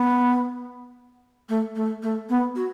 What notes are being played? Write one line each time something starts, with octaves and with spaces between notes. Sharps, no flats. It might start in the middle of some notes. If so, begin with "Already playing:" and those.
Already playing: B3
A3
A3
A3
B3
F#4